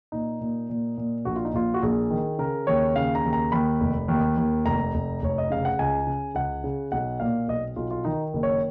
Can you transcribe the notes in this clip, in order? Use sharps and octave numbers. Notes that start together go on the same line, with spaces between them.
A#2 D#4
A#2
A#2
A#2
A#1 F#4
F4
D#4
A#1 F4
F#4
A#1 G#4
D#3
C#3 A#4
D#2 C#5
C#3 F5
A#5
D#2
A#5
D#2 B5
F1
D#2
D#2
F1 A#5
F1
F1 C#5
D#5
C#3 F5
F#5
C#2 G#5
C#3
C#2 F#5
C#3
B1 F#5
A#2 F5
B1 D#5
B1 F4
F4
D#3 D#4
F#1
C#5